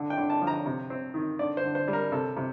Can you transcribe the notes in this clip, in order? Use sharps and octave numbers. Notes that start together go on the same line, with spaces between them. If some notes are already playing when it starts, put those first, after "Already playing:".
Already playing: D3
G5
D3
A5
F3
A#5
C3
C4
D#3
D3 D5
C5
D3
C5
G3
A#4
C3 A4
C3